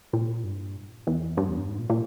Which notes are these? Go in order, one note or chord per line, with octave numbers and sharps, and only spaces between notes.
A#2
G2
E2
G2
E2
G2
G#2
A#2
A#2